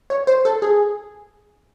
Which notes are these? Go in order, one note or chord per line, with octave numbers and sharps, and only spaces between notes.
C#5
C5
A4
G#4